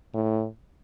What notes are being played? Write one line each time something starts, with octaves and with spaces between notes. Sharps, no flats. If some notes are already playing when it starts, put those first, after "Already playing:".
A2